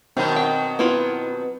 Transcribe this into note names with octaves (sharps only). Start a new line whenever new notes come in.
B2 D#3 F#3 C4 D#4 A#4
G5
B3 E4 F4 B4